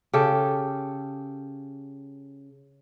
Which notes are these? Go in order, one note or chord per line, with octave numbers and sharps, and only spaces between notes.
C#3 G4 A4